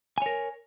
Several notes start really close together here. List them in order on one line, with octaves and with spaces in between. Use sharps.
G#5 C#5 A#4